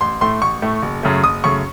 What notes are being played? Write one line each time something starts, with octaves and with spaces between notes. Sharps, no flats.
A1 C6
A2 A3 C6
A1 C#6
A2 A3
F#1
F#2 C#3 A3
F#1 D#6
F#2 C#3 A3 C#6